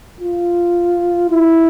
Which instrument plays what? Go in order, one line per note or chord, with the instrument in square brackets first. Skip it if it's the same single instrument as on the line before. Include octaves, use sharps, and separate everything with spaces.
[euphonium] F4
E4